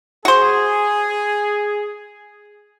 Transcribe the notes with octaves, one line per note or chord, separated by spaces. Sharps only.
F#4 G#4 C5